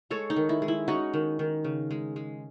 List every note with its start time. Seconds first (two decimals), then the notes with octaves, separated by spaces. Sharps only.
0.11 G#3 A4 C#5
0.30 D#4
0.36 D#3
0.49 E4
0.62 G#3
0.68 E4
0.88 C#4 D#4 F#4
1.14 D#3
1.39 D#3
1.64 C#3
1.91 G#3
2.16 G#3